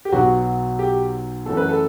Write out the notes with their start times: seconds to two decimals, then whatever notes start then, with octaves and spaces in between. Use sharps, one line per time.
0.05 G4
0.12 B1 B2 F#3 B3 F#4
0.79 G4
1.46 F#2 E3 A3 A4
1.57 B4
1.69 A4